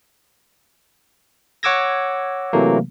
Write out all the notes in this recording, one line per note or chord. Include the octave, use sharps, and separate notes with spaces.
C#5 F#5 D6 E6 G#6 A#6
C3 E3 F#3 A3 A#3